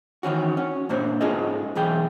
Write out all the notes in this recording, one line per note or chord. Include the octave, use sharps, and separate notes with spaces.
D#3 E3 C#4 F#4
C#4
G2 A#2 A#3 D4 C5 C#5
G#2 C#4 F4 G#4 A4 D#5
B1 E3 G#4 G5